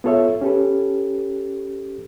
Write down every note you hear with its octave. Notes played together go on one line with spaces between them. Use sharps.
B3 F4 A4 C#5 E5
C#4 G4 A4 B4